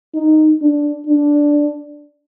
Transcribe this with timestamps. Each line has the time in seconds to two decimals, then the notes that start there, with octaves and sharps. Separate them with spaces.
0.15 D#4
0.62 D4
1.07 D4